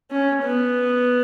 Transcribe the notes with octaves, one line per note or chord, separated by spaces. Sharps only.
C#4
B3